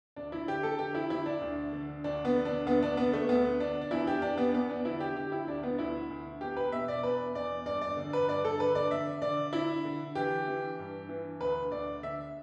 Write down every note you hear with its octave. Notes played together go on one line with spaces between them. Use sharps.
D2 D4
E4
D3 G4
A4
D3 G4
E4
D3 E4
D4
D2
D3
D2 D4
B3
D3
D4
D2 B3
D4
D3 B3
A3
D2 B3
D3 D4
D4
E2 E4
G4
E2 D4
B3
E2 B3
D4
D3 E4
G4
D3 G4
E4
D2 D4
B3
D2 E4
D2
E2 G4
B4
B2 E5
D5
E2 B4
E2 D5
G2 D5
D5
D3
B4
G2 D5
A4
D3 B4
D5
D3 E5
D3 D5
D3 E4
D3
E3 G4
E3
G2
E3
D2 B4
D2 D5
D3 E5